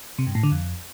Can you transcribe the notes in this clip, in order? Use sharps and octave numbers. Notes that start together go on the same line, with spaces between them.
C3
G2
A2
D3
F2